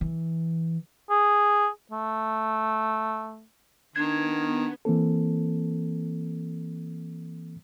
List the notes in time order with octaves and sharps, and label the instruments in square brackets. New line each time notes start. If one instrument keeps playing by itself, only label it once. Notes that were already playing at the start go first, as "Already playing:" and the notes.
[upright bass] E3
[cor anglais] G#4
A3
[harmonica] D#3 [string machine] B3 [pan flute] D4 [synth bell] G#6
[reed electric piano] E3 A#3 C4 A4